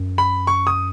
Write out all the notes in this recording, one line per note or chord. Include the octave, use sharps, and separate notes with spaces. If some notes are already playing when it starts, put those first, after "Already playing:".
Already playing: F#2
B5
C#6
D#6